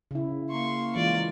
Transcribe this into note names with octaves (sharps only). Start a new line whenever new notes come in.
C#3 E4
A#3 C6 C#6
E3 G#3 F4 D5